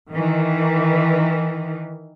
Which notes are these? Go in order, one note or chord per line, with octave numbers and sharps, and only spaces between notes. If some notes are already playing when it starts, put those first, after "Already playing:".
D#3 E3